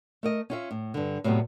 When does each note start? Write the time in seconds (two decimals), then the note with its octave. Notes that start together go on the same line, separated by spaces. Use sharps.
0.23 A3 A#4 D#5
0.50 C#4 F4 E5
0.71 A2
0.94 G2 D3
1.24 A2 C3 F#3 G3 B3